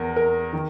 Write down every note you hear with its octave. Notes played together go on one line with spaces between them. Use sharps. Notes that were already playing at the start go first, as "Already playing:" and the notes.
Already playing: E2 A#4
A#4
D#3